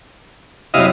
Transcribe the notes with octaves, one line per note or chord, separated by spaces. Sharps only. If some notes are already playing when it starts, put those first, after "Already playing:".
F#2 C3 E4 D#5 F5